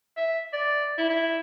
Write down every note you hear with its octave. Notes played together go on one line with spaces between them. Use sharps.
E5
D5
E4
E4